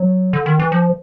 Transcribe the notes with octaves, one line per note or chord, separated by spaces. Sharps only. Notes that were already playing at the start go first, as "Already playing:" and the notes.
Already playing: F#3
D3
D#3
E3
F3